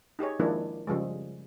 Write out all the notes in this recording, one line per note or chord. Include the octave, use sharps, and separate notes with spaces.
D#4 G4 G#4 C#5
D#3 F3 G#3 A#3 D4 E4
C#3 F3 G3 G#3